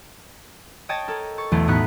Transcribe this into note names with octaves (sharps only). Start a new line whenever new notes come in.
C#5 D#5 G5 A5 G#6 A6
A4 A#4
C#6 A6
B1 E2 E3 A3
A2 B3 D#4 F#4 F#6 B6